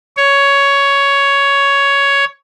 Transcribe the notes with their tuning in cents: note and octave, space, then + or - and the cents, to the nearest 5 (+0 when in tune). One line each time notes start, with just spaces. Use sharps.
C#5 +10